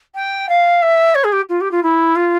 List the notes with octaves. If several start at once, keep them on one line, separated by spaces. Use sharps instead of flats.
G5
F5
E5
C#5
G#4
G4
F4
G4
F4
E4
F4